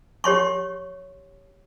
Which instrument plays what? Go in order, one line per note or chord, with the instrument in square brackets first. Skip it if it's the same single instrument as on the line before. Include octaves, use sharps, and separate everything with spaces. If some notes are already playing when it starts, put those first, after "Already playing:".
[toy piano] G4 C#5 C6 C#6